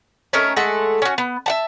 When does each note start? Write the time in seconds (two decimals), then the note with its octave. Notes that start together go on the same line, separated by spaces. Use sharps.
0.33 A3 C#4 D#4 A#4
0.56 G#3 A3 A4 F#5
1.02 C#4 F#4
1.18 B3
1.46 E5 F#5 A5